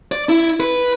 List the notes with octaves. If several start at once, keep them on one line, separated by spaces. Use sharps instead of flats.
D5
E4
B4